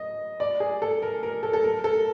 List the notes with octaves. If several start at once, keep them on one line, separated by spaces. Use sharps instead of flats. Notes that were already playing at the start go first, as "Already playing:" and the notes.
Already playing: D#5
D5
G#4
A4
A#4
A#4
A4
A4
A#4
A4